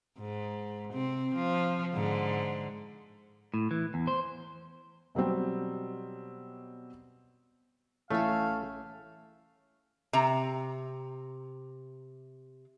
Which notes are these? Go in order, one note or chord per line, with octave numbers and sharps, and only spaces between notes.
G#2
C3 C4
F3
G#2 D3
A2
E3
E2
C5
B2 F#3 G3 C4
A1 E3 A3 C#4 A4 E5 F5
C3 A#5